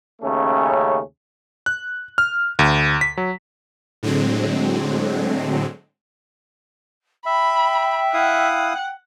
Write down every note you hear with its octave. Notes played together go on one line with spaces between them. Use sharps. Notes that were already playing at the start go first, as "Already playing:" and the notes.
D#2 C#3 A3 C#4
F#6
F6
D2
B6
F#3
A2 D3 F#3 G#3 C4
E5 G5 B5
E4 F5 F#5 D#6